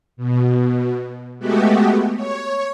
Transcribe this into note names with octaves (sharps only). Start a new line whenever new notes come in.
B2
G#3 A3 B3 F#4 G4
C#5